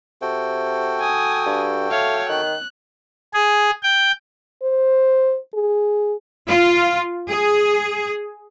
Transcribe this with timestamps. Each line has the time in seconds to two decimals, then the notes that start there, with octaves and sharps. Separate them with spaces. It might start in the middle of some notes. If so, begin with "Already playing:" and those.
0.22 C3 F#4 A4 G5
1.00 G#5 D#6
1.46 G2
1.91 A3 C#5 F5
2.29 D#3 F#6
3.34 G#4
3.83 G5
4.63 C5
5.54 G#4
6.47 F4
7.28 G#4